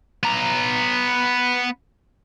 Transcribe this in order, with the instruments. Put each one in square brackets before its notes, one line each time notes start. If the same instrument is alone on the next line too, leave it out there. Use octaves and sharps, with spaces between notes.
[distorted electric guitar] B3 A#5